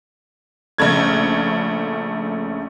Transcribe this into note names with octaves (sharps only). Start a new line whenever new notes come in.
A#1 C#3 A3 G#6